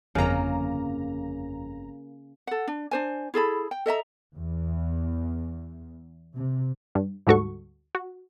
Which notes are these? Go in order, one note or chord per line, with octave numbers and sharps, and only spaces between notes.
G1 F2 C#3 A#3 A#5
A4 F#5
D4
D4 C5 G#5
E4 G#4 A4 B5
G5
A4 D#5 E5 A#5
E2
C3
G2
D2 G#2 G3 F#4 A4 C#6
F#4